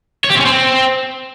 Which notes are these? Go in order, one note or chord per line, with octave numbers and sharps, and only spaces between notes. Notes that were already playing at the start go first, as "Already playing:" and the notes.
C#5
G4
C4
C#4
C4